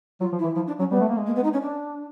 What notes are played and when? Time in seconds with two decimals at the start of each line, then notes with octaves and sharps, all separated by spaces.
0.20 F#3 F4
0.33 F3
0.39 E4
0.44 E3
0.55 F3 E4
0.67 D4
0.79 F#3 C#4
0.91 G3 B3
1.00 A3
1.09 A#3
1.17 G#3
1.26 A#3
1.36 B3
1.44 D#4
1.53 C#4
1.62 D4